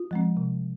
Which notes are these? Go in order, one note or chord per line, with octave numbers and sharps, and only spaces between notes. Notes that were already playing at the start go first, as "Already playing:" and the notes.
Already playing: F4
F3 G#3 C4
C3